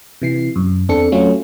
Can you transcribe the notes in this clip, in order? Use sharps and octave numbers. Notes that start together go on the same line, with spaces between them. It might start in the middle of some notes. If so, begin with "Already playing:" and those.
C3 E3 C7
F#2
E2 C4 D4 A4 C#7
F#3 A3 C#4 F4